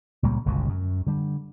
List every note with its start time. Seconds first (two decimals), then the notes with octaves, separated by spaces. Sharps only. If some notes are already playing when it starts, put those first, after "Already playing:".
0.23 C#2 A#2 G3 A#3
0.46 G1 C#2 B2
0.69 F#2
1.07 D3 G3